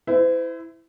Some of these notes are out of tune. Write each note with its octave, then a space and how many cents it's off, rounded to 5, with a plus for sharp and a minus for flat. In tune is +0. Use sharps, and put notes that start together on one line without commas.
E4 +0 C5 -45